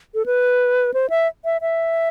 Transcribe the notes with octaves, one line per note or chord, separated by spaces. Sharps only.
A4
B4
C5
E5
E5
E5